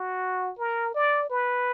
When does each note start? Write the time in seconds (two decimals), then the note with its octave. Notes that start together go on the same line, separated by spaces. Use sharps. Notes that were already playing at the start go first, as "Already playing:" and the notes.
Already playing: F#4
0.59 A#4
0.95 D5
1.30 B4